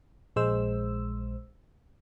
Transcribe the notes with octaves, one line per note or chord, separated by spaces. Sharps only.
A#1 G#3 C5 E6